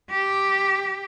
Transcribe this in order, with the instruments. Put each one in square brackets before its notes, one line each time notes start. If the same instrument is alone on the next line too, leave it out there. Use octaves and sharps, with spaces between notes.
[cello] G4